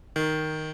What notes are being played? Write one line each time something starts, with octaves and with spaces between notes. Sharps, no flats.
D#3